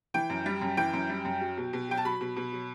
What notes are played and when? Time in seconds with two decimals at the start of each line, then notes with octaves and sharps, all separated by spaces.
0.14 E3 G5
0.30 F#2
0.46 G3
0.61 F#2
0.77 E3 G5
0.93 F#2
1.10 G3
1.25 F#2
1.41 F#3
1.57 B2
1.73 B2
1.89 F#3 G5
1.97 A5
2.05 F#3 B5
2.21 B2
2.36 B2
2.52 F#3